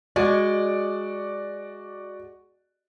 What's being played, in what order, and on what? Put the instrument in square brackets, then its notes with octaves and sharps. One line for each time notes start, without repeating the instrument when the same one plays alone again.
[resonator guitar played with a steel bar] G#3 [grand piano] F#4 D5